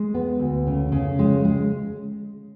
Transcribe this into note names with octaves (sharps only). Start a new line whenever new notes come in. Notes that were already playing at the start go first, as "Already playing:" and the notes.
Already playing: G#3
B3
D2
C#3
C#3
G#3
G#3